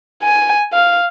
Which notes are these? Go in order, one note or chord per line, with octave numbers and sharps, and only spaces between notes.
G#5
F5